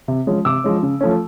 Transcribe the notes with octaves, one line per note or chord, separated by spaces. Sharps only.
C3
F3 G#3 C#4
C3 D6 E6
F3 G#3 C#4
C#3
F3 A3 C#4